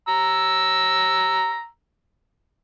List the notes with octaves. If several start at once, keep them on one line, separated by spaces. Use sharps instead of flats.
A#5 E6